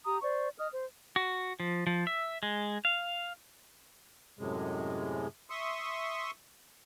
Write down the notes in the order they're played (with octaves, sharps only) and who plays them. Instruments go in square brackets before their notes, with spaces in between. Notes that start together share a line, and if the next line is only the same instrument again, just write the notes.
[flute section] G4 A#5 D#6
C5 D5 C#6
D#5 D#6 F6
C5
[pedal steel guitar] F#4
F3
F3
E5
G#3
F5
[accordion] F#2 A2 C3 G#3
E5 C6 C#6 D#6